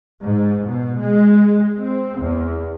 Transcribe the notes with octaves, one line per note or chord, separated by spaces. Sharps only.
G#2
B2
G#3
C4
E2